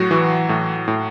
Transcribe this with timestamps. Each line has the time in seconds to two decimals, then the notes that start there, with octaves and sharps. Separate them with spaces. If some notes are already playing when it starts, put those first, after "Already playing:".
Already playing: A2 F#3 F#4
0.11 E3
0.49 A2
0.88 A2